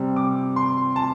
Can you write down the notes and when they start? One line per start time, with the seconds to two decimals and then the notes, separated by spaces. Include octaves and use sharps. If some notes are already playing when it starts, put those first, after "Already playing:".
Already playing: C3 G3 C4
0.16 D6
0.56 C6
0.96 A5